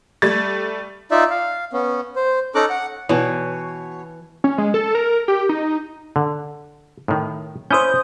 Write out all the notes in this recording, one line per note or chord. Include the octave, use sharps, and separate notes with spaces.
G3 A3 A6
D#4 F4 D5 E5
F5
B3 C#4
C5
C#4 D#4 A4 A#5 D6 F#6
F#5
B2 E3 C#5
C#4
G#3
A4
A#4
G4
D#4
D3
A2 D#3
C#4 E4 C5 D#6 G6